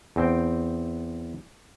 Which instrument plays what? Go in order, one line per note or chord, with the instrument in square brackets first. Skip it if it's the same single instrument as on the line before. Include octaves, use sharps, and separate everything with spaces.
[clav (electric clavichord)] E2 C4 G5